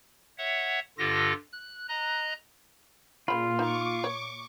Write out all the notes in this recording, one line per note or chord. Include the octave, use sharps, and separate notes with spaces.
C#5 E5 F#5
G2 D3 F4 G4 A4 A#6
F#6
D#5 A#5 F#6
A#2 C#3 F4 B5
D#4 C#6 D6
C#5